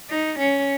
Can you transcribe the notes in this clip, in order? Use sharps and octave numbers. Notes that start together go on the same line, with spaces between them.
D#4
C#4